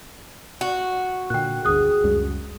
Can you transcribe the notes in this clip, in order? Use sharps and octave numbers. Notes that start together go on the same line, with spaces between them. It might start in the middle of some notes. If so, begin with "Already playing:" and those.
F#4
A#2 D3 G5 F#6
G1 D2 G#4 D#6 F#6
C#2 F#2 G3